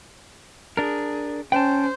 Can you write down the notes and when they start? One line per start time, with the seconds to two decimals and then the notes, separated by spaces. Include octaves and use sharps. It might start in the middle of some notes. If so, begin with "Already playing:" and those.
0.77 D4 G#4 A#4
1.52 C#4 C5 G5 A5